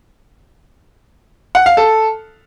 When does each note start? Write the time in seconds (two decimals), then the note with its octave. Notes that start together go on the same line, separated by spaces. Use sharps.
1.55 F#5
1.66 F5
1.77 A4